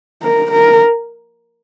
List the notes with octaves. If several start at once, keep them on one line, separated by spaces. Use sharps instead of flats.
A#4
A#4